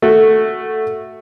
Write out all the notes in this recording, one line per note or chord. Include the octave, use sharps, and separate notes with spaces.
A3 F#4